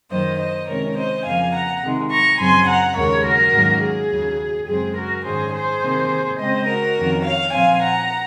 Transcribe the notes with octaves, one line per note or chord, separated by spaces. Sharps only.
F#2 D#3 F#3 A#3 C5 D#5
C5 D#5
C3 D#3 G#3 C#4 A#4 C#5
C5 D#5
F2 C#3 F3 A#3 F5 G#5
F#5 A#5
C3 D#3 G#3
A#5 C#6
F#2 C#3 F#3 C4 G#5 C6
F#5 A#5
D#2 C#3 G#3 A#4 C#5
F#4 A#4
G#2 D#3 F#3 A#3 C#4
G#4
D#2 C#3 F#3
F#2 C#3 G#3 C4 G#4
F#4 A#4
G#2 D#3 G#3 C#4 G#4 C5
G#4 C5
C3 D#3 A#3
C#3 G#3 C4 C5 D#5
F#4 A#4
F2 D#3 A#3 C#4
C#5 F5
A#2 F3 C4 F5 G#5
F#5 A#5